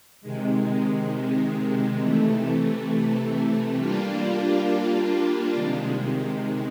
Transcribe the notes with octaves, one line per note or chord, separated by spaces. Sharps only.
C3 D#3 G#3
C3 E3 A3
G3 A#3 D4 F4
C3 D#3 G#3